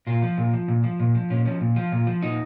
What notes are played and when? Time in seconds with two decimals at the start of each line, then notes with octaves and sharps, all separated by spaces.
0.07 A#2 F4
0.22 F3
0.38 A#2
0.53 F3
0.68 A#2
0.84 F3
1.00 A#2
1.14 F3
1.30 A#2 C#4
1.45 F3 C#4
1.61 A#2
1.76 F3 F4
1.92 A#2
2.07 F3
2.22 A#2 D#4